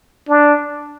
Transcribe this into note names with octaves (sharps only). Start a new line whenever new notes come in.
D4